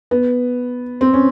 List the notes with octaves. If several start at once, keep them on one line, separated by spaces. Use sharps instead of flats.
B3
C4
C#4